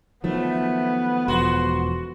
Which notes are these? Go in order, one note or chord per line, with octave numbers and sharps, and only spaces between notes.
D#3 F3 F#3 A3 B3
E1 F3 F#4 C6